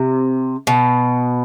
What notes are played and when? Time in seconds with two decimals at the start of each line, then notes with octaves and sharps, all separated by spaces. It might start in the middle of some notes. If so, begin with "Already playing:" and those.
Already playing: C3
0.67 B2